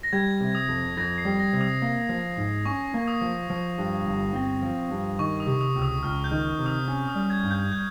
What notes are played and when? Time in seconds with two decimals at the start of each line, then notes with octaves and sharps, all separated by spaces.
0.03 A#6
0.13 G3 G#6
0.41 C3
0.55 D#6
0.69 F2
0.97 F2 A#6
1.18 C7
1.25 G3
1.39 A#6
1.53 C3
1.61 D#6
1.82 A#3
2.09 F3
2.37 G#2
2.65 C#4 C#6
2.94 A#3
3.08 D#6
3.21 F3
3.50 F3
3.78 G2
4.06 G1
4.34 C4
4.62 F3
4.91 G2
5.19 D#3 C#6
5.40 D#6
5.47 C3
5.61 D#6
5.76 C#2
5.82 D#6
6.03 C#2 F6
6.24 G6
6.31 D#3
6.59 C3
6.66 D#6
6.88 C#4
7.08 D#6
7.15 G3
7.30 G#6
7.43 G2
7.51 G6
7.72 G6